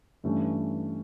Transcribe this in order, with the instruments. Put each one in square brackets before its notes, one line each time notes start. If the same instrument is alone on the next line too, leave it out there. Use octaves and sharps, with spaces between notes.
[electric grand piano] G2 E3 A3 C#4